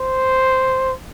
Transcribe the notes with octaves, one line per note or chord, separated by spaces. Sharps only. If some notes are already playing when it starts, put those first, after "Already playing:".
Already playing: C5